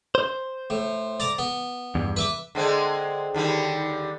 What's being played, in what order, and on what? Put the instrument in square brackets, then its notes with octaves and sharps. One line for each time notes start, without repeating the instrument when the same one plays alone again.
[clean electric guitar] C5
[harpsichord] A2
D5 A#5 D6
B3
[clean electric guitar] E2 G2
[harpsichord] B4 E5 D6
[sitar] D3 G#3 C4
D#2 D3 G3